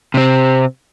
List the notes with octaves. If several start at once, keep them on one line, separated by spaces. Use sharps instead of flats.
C3 C4